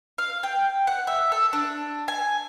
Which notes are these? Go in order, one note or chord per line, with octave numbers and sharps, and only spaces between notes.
F5
G5
F#5
E5
A4
D4
G#5